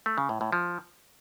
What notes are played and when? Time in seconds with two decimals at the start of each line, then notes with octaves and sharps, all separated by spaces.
0.06 A3
0.18 C#3
0.29 A2
0.41 A2
0.52 F3